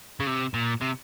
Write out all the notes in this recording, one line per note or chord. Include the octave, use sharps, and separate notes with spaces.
C#3
C3
A#2
C3